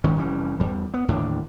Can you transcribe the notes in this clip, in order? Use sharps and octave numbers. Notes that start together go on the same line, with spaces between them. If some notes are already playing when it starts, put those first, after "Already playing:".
D#1 D#3 G#3 C#4
F1 E3 G3 C#4
E2 G3
B3
D#2 A2 D3 D4